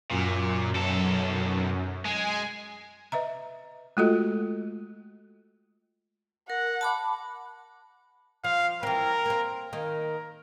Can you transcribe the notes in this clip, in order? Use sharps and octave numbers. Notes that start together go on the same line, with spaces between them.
F#2 A#2
B1 A4
G#3 G#5
B4 D#5 E5 A#5
G#3 A3 F4 F#4 A4 D#5
A#4 F#5
A5 B5 D6
F3 F5
E3 C4 A#4
A#3 C4
D#3 A#3 A#4